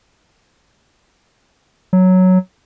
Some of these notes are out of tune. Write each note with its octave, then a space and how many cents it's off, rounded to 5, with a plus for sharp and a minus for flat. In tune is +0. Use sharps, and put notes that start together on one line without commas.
F#3 +0